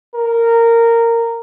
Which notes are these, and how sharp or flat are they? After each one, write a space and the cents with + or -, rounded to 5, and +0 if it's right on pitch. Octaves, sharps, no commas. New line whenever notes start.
A#4 -15